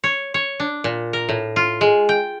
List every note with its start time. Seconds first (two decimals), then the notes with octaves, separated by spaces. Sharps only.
0.04 C#5
0.34 C#5
0.60 D4
0.84 A#2
1.13 A#4
1.29 A2
1.56 F4
1.81 G#3
2.09 G5